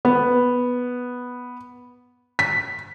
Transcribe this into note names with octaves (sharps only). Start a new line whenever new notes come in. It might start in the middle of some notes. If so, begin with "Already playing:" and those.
B3
B6